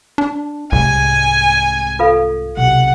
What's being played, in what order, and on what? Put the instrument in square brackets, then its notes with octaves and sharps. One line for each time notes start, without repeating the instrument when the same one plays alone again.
[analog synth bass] D4
[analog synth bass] C2 [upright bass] G#2 C3 [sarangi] G#5
[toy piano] F4 A4 F5
[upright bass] B1 C3 [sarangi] F#5